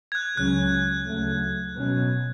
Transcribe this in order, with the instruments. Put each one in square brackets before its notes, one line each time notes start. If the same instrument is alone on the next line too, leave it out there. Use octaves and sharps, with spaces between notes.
[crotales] G#6
F#6
[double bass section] C#2 C#3 F#3 C#4 [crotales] F#6
[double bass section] D2 C#3 F#3 A3
B2 F#3 C#4